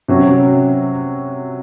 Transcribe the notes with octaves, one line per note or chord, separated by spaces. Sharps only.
C3 F#3 C#4 F#4